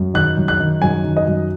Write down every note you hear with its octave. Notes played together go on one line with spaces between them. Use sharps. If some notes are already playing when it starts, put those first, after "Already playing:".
Already playing: F#2
D#3 F#6
F#2
F#6
D#3
F#2 G#5
D#3
D#5
F#2